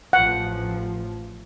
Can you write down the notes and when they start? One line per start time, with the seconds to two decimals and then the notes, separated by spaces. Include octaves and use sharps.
0.13 A1 F3 F#5